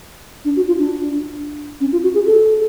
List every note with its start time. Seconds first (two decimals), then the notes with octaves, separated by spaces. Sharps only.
0.45 D4
0.56 F#4
0.67 F4
0.79 D4
1.80 C#4
1.92 F4
2.03 F#4
2.14 G#4
2.26 A4